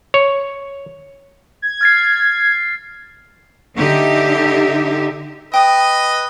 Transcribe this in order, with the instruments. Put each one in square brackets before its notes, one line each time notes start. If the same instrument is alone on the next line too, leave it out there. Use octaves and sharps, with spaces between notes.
[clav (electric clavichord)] C#5
[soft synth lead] G#6
[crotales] F6 A6 C7
[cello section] D3 D#4 G4 E5
[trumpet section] B4 D#5 [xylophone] G5 D#6